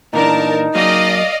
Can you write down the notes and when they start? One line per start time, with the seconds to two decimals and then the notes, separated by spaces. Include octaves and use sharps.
0.13 A#2 E3 D4 D#4 A#4 A5
0.75 F#3 A#3 D5 D#5 F5